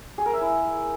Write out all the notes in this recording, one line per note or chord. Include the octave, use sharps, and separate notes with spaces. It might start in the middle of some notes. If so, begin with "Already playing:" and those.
G#4
A#4
E5
E4